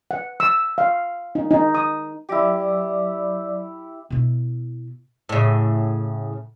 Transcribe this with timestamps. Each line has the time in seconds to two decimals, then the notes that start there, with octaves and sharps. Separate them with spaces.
0.11 F#5
0.40 E6
0.78 F5
1.35 D#4
1.51 D#4
1.75 D#6
2.29 F#3 E4 G4 D5 D6
4.10 B2 E4
5.29 A2 C#3